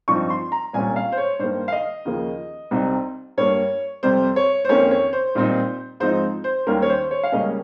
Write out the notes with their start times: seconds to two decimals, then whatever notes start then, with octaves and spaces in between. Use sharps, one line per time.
0.08 G2 F3 C4 D#4 C#6
0.30 C6
0.52 A#5
0.73 C2 A#2 G3 C#4 G#5
0.96 F5
1.12 C5
1.18 C#5
1.39 G2 D#3 A#3 C5
1.68 F5
1.72 D#5
2.05 D#2 C#3 F3 A#3
2.71 C2 C3 G3 C4 D#4
3.37 G2 G3 A#3 C#5
4.03 F2 C3 G3 C5
4.36 C#5
4.65 C5
4.69 F2 D#3 A#3 C#4 C#5
4.91 C#5
5.13 C5
5.35 A#2 G3 C4 D#4
6.00 G#2 F3 C4 D#4 C5
6.44 C5
6.67 D#2 D#3 G3 A#3 C#4 A#4
6.82 C#5
6.89 C5
7.11 C#5
7.24 F5
7.32 C#2 C#3 G3 A#3 C#4 D#5